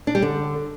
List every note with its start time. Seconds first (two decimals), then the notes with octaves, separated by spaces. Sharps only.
0.07 D4
0.15 G3
0.22 D3